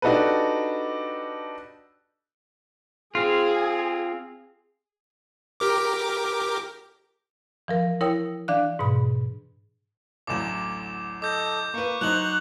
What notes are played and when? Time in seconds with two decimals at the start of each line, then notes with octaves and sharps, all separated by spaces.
0.02 D4 D#4 F#4 G4 A4 B4
3.15 C4 F4 G#4
5.60 G4 A#4 D6
7.68 E3 F3 A#4
8.01 E4 A#4 C#5 G5 D#6
8.48 E3 D4 D5 F5 F#6
8.79 G#2 B2 B5
10.27 A1 D2 F#3 D6 E7
11.22 A4 D#5 D6 G6
11.74 A#3 B4 C#6
12.01 F#3 D#4 C5 F#6 F7 F#7